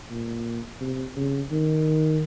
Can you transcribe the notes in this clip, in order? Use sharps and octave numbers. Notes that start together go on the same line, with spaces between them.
A#2
C3
C#3
D#3